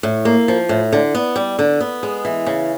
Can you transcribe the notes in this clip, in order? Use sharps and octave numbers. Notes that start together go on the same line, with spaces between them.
A2
A#3
F3
A2
D3
B3
G3
D3
B3
G#3
E3
C#3